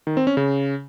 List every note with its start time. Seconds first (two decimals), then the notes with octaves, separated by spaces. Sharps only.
0.07 D#3
0.17 C4
0.27 C#4
0.37 C#3